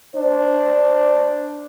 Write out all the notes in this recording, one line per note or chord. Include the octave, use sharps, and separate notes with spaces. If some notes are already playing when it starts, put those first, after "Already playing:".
D4 C5